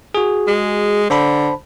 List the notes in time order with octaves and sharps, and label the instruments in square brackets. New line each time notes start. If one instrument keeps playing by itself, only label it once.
[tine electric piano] F#4 G#4
[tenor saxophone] G#3
[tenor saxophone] D3 [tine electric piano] C5 A5 B5